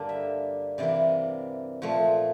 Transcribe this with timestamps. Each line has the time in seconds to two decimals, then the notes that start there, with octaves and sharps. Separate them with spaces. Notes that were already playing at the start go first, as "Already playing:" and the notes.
Already playing: G2 D3 A#3 D4
0.09 E5
0.78 C3 E3 A#3 D5
1.82 A#2 F3 A3